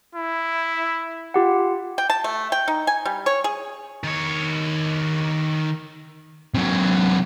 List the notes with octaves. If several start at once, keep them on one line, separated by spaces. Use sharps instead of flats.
E4
F4 G4 F#5
G5
A5
A3
G5
D#4
G#5
G3
C#5
G#4
D#3 C#5
C3 F#3